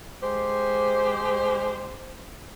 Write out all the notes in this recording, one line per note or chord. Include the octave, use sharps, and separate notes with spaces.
G#3 G4 C5